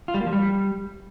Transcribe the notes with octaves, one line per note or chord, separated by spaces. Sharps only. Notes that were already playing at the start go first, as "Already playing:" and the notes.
F4
G3
A#3
F3
G3